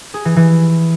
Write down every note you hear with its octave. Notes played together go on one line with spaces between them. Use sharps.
G#4
E3
E3